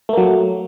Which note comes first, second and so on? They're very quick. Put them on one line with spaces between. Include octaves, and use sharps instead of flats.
A3 A#3 F#3